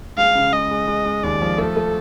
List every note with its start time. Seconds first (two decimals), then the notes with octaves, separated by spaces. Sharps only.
0.18 G#3 F5
0.35 C#3
0.53 G#3 D#5
0.71 G#3
0.88 G#3
1.05 G#3
1.23 D#2 D5
1.41 F3
1.58 A3 A4
1.76 A3